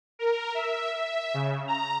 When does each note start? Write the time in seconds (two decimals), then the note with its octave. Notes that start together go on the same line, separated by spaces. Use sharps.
0.19 A#4
0.55 E5
0.94 E5
1.34 C#3
1.67 A#5